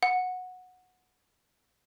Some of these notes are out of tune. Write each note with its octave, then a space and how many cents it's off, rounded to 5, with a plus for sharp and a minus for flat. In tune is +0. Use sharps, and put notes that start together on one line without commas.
F#5 -10